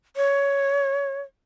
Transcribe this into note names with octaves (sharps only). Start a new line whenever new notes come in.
C#5